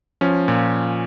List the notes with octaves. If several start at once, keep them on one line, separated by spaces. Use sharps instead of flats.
F3 C#4
A#2